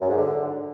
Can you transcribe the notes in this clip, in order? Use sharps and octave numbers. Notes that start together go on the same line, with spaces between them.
F#2
G#2
D3